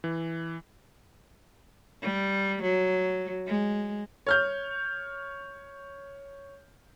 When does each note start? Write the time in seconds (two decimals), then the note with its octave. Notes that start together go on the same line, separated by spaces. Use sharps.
0.04 E3
2.02 G3
2.63 F#3
3.47 G#3
4.27 C#5 F6 G6